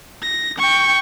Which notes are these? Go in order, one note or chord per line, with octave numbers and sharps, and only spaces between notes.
A#6
G5 C#6